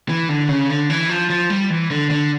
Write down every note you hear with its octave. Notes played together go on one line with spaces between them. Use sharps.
E3
D3
C#3
D3
E3
F3
F3
G3
E3
D3
D3